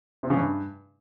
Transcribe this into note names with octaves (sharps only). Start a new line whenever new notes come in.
C3
C#3
G2